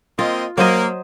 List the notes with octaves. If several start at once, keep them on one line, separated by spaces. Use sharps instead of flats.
A#3 C4 F4 D#5
F#3 A#3 C5 D#5